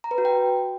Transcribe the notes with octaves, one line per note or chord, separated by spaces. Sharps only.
A#5
B4
F#4
G5